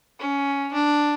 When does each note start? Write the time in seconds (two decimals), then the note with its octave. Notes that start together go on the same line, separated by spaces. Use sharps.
0.20 C#4
0.73 D4